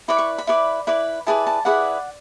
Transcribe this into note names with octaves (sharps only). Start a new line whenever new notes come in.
E4 B4 D5 B5
C#6
B5
E4 B4 D5
E4 B4 D5
E4 G#4 B4 D5 A5
A5
E4 G#4 B4 D5 F#5